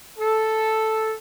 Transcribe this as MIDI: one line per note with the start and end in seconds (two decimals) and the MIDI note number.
0.19 1.13 69